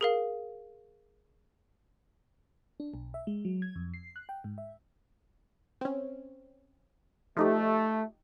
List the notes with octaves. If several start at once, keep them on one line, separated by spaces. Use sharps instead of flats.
G#4 A#4 F5
D4
B1
E5
G#3
F#3
G#6
F2
C7
F#6
G5
G#2
E5
C4 C#4
F3 A3 D#4 G4